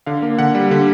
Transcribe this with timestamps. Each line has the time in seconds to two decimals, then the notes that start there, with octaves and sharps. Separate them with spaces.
0.06 D3 F5
0.22 A#3
0.39 D3 F#5
0.55 G3
0.71 D3